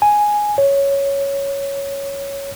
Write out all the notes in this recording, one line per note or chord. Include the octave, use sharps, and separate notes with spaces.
G#5
C#5